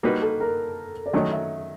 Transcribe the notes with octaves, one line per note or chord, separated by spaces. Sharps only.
G3 A#3 D#4 F#4 B4
A4
A#4
D5
D#3 F#3 A3 C#4 D#5
E5